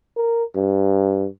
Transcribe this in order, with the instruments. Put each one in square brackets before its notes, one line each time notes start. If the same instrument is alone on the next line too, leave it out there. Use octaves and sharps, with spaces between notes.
[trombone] A#4
G2